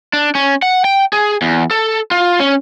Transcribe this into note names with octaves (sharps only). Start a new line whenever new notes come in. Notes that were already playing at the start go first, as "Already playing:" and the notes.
D4
C#4
F#5
G5
G#4
E2
A4
F4
C#4